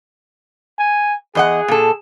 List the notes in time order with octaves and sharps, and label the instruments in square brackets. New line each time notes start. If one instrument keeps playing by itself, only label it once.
[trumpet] G#5
[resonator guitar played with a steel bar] E2 D#5 F#5 [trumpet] G#4
[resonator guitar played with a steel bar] A#2 A4